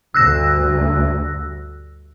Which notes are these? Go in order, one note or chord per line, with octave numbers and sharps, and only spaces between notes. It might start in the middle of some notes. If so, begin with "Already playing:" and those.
D2 G2 E6 F#6 A#6